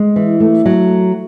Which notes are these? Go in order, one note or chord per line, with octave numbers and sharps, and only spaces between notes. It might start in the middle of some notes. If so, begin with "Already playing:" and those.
Already playing: G#3
E3
A3
F#3